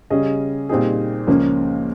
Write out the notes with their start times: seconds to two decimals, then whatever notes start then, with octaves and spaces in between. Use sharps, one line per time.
0.10 C#3 G3 C#4 G#4 D#5
0.69 A#2 G3 C4 D#4 G#4
1.27 C#2 C#3 F3 A#3 C#4